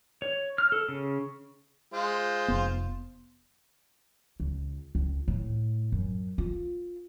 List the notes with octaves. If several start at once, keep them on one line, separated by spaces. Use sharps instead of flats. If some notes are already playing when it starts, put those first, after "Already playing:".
C#5
F6
A4
C#3
G#3 F4 C5
F1 B3
C#2
C#2
A2
F#2
F4